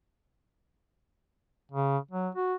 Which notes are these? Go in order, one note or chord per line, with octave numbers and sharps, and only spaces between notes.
C#3
F#3
F#4